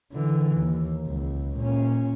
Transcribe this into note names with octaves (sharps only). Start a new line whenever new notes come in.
D3 E3
D#2
C#2
A#2 C#4